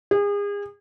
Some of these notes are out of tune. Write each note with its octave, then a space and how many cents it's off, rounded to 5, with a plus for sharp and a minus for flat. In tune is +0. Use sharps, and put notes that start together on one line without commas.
G#4 -35